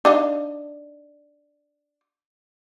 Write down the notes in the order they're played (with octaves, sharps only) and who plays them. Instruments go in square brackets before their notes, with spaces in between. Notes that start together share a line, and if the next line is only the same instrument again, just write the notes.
[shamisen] D4 D#4 F5